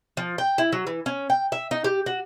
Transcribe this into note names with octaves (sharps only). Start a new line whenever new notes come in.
F3
G5
E4
F#3
E3
C#4
G5
E5
D#4
G4
F#4